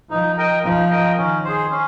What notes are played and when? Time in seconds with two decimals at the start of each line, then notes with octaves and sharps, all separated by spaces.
0.11 F3 D#4
0.38 A#4 D#5 G5
0.64 F3 D#4
0.90 A#4 D#5 G5
1.17 D#3 C#4
1.44 G#4 C5
1.71 C#4